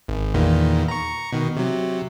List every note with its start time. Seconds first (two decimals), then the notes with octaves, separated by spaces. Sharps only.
0.08 G#1
0.34 E2 A#2 D#3
0.88 A#5 C#6
1.32 B2 D#3
1.57 C3 F#3